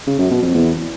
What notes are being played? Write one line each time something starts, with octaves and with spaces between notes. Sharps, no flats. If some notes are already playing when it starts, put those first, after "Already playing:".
C#3
F#2
B2
F2
E2